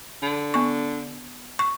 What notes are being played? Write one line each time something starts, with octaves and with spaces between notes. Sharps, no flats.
D3
B3 C#6
C#6